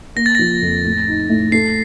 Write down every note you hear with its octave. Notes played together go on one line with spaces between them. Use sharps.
A#3 A#6
A6
F3 A#6
F2
A2
D#4
A2
A3 C7